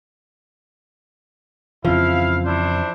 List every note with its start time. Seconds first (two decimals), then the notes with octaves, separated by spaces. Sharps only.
1.85 F2 C#3 E3 F3 E4 F5
2.43 D4 E4 C5